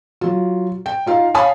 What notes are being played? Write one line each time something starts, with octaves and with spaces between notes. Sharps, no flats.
F#3 F4
G5
D#4 F4 F5
C#5 F5 G#5 A5 B5 D#6